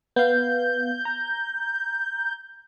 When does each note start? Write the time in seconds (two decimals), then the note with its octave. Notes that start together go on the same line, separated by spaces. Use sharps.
0.16 B3 F5 G6
1.05 A#5